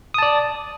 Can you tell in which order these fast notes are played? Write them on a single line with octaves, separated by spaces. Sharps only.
D#6 A5 D5